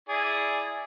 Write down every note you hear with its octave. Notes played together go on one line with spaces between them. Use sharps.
E4 G#4 D5